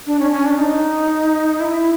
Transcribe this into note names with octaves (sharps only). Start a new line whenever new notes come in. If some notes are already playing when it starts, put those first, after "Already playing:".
D4
C#4
C#4
D4
D#4
E4